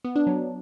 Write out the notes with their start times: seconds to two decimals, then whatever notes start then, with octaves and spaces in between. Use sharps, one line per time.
0.04 B3
0.16 D4
0.27 F#3